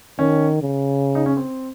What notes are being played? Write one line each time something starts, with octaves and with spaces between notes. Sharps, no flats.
D#3 C#4
C#3
D#4
C#4
C4